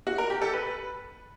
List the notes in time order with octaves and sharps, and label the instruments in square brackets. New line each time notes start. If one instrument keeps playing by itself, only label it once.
[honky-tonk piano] F#4
A#4
G4
A4
B4